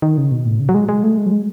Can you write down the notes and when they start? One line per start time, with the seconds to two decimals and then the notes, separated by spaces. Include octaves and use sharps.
0.02 D#3
0.18 C#3
0.31 B2
0.46 A2
0.60 C#3
0.69 F#3
0.74 G#3
0.89 G#3
1.03 A3
1.18 G#3
1.26 F#3
1.32 G#3